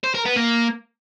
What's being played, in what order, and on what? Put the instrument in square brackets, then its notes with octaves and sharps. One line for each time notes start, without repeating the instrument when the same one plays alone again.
[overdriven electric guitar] C5
A#4
B3
A#3